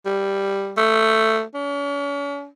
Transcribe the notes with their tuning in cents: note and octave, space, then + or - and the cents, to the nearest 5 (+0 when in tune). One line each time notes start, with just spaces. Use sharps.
G3 +5
A3 +10
C#4 +40